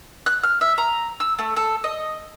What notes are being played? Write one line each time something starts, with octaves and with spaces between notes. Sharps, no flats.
F#6
F6
E5
A#5
E6
A3
A4
D#5